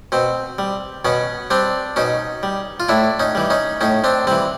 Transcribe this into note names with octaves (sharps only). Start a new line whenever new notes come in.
B2 C4
G3
B2 B3 C#4
G3 C4 D4
B2 C#4 D#4
G3
F4
A2 D4 E4
C#4 D#4
E3 G3
C#4 D#4
A2 C#4 D#4
C4 D4
E3 G3 C4